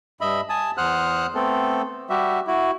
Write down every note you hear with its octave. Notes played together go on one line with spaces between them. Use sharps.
G2 D#5 E5 B5
G#5 A5 D#6
E2 C5 F#5 D#6 F6 F#6
A3 B3 C4 A4
G3 F#4 G4 E5
E4 F#4